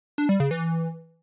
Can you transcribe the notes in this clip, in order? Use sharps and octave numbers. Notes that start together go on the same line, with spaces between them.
D4
G3
C#3
E3